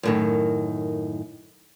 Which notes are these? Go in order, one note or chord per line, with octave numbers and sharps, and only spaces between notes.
F#2 A2 D#3